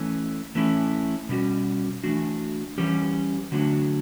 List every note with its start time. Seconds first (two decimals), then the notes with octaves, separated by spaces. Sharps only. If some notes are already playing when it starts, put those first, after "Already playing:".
Already playing: E3 A3 C#4
0.55 E3 A3 C#4 E4
1.29 B2 G3 C#4 F#4
2.04 E3 A3 D4 F#4
2.78 E3 G3 C#4 G4
3.52 D3 F#3 A3 D4 F#4